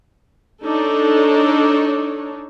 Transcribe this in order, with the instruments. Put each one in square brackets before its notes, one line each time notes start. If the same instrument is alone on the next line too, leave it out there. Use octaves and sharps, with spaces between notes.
[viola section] D4 D#4 A4 C#5